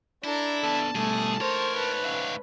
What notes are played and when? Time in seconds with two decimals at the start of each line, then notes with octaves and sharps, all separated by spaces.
0.24 D4 E4 A4 A#5
0.64 B3 A4 A5
0.95 B2 G3 A3 G#4
1.41 G#2 A#4 C5 C#5
1.76 B4 A5
2.04 C#4 E5 F5